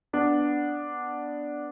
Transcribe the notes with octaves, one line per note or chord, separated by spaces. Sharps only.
B3 D4